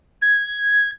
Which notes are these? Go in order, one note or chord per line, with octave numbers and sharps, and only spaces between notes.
G#6